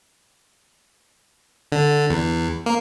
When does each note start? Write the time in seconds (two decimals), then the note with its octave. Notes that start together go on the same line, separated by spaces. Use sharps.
1.72 D3
2.10 E2
2.66 A#3